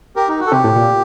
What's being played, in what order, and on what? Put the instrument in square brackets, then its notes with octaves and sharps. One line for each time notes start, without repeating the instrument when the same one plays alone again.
[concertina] G4 A#4
D#4
F#4
A4
[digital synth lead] C3 [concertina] G4
[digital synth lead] A2
A#2